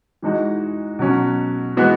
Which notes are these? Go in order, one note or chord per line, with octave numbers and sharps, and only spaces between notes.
E3 G#3 D#4 F#4
B2 F#3 C#4 F#4
E3 G#3 B3 F#4